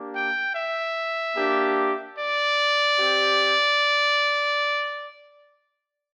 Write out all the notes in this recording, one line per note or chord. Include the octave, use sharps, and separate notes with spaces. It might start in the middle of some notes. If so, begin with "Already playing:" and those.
Already playing: A#3 D4 G4
G5
E5
A#3 D4 G4
D5
C4 G4